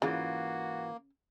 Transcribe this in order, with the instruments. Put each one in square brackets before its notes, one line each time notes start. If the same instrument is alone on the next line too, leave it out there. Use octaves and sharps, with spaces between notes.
[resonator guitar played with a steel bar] G#2 E3 F4 [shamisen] C#3 [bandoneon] A#3 [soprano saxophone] F#4